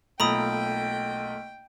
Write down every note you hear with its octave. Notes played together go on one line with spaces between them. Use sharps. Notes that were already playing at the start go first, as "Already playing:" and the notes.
B1 A3 A#3 F4 G5 A#5 B5 D#6